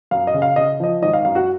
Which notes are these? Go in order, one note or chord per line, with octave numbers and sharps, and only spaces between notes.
F#2 F5
D#5
C#3
F5
C#3 D#5
F3 D#5
G#1 D#5
F5
F#2 F5
F#4 F#5